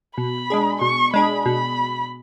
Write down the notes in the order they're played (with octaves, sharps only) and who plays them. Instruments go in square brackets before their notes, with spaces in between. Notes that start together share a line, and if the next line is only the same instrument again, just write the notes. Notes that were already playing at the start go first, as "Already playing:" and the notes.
[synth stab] B2 [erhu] B5
[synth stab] G#3 D4 G#4
[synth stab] B2 [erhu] C#6
[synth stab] G#3 D4 G#4 [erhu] B5
[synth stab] B2 [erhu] B5